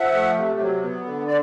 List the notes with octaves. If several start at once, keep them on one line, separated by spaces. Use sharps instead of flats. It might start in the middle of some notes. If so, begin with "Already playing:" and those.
Already playing: F3 E5 F#5
A3
C3
F#3
B3
D3
D5